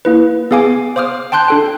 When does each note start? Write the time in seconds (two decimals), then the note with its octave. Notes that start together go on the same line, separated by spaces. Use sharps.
0.05 A#3 E4 B4
0.51 B3 G#4 F5 G#5 D6
0.96 C5 F5 D6 D#6 F6
1.32 G5 A5 C6 F#6 G6
1.48 D4 A4 G5